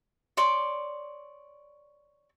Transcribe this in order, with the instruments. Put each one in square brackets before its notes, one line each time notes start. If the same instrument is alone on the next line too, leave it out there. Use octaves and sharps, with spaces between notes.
[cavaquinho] C#5 D5 C6 D6